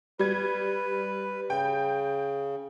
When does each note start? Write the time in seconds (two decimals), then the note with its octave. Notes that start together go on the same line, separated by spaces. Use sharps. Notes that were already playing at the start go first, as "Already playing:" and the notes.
0.19 G3 B4 G#6
1.50 C#3 G5